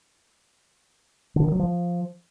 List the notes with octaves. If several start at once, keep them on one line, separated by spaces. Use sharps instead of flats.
D3
D#3
F#3
F3